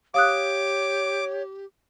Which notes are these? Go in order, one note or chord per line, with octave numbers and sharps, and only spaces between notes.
G4 C#5 F5 D6 D#6 F#6